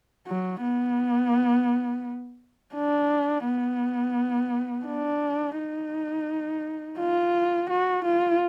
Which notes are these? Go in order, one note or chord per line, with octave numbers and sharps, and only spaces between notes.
F#3
B3
D4
B3
D4
D#4
F4
F#4
F4